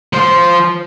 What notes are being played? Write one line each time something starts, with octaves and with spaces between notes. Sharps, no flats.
F3 C5